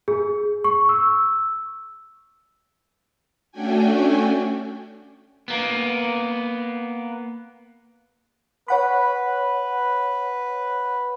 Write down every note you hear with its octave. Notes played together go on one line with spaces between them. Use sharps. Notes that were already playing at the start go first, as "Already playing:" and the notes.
G#4
C#6
E6
A3 C#4 D4 F#4 G5 G#5
A#3 B3
B4 C#5 F#5 B5